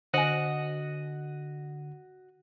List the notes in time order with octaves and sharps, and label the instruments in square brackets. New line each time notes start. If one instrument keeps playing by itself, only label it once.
[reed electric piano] D3 [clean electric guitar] F#4 D#5 F#5 [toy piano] C5 G#5